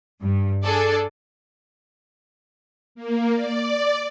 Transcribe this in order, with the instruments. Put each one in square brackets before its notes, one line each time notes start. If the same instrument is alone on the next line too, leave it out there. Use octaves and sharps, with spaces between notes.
[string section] G2
D4 G#4 A4 D5
[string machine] A#3
D5